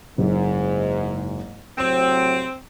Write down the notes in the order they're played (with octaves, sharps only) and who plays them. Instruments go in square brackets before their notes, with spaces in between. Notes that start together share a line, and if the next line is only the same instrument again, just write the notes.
[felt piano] F#1 [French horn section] G#2
[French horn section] A2 C3 F#3 [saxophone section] C4 [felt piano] E7